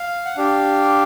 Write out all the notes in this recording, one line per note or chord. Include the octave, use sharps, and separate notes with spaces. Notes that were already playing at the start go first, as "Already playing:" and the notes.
Already playing: F5
F#5
D4 G4 F5